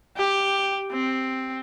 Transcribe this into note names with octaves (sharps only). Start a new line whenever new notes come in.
G4
C4